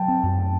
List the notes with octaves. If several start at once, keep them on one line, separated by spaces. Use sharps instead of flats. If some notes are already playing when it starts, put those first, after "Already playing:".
Already playing: F#3 G5 A5
C4
F#2
A3